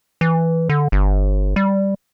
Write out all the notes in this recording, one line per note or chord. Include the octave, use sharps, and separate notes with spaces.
E3
D3
G1
G3